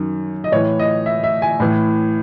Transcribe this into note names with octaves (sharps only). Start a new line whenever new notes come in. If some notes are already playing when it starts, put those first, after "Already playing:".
Already playing: F#2 D#3
D#5
A2 E3 C#5
D#5
E5
E5
G#5
A2 E3